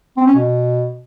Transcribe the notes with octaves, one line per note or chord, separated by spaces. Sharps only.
C4
C#4
B2